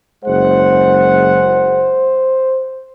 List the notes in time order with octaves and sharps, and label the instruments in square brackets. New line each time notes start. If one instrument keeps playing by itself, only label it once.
[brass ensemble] F#1 G#3 F#5 [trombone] C5